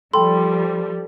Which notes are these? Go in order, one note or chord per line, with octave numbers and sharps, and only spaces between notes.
F3 G3 A4 G5 B5 C6